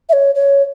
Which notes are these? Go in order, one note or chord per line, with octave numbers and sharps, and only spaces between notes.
E5
C#5
C#5